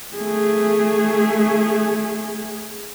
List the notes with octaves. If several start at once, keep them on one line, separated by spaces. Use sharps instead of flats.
A3 G#4